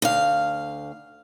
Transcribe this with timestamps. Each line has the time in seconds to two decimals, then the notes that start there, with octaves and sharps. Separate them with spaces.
0.02 D2 F5